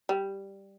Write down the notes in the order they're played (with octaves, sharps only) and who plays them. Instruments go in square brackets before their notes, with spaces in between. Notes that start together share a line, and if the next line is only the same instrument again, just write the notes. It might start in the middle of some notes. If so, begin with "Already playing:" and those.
[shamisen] G3